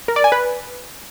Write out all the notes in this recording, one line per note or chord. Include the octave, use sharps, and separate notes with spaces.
A#4
D5
G#5
B4